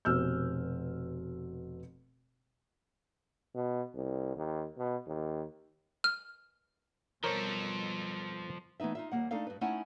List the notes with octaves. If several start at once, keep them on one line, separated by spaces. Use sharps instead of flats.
F1 B2 E6 F6 G6
B2
C2
D#2
B2
D#2
F6
B2 F3 G3 A4 A#4 C5 C#5
E3 A3 B3 D#4 E5
D#4 F4 E5
D#2 G3 A#3 F#5
A3 D4 D#4 A4 D5 F5
G2 B4
A3 C#4 D#4 E4 F#5 G#5